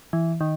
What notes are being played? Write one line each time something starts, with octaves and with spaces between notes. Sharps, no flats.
E3
D#3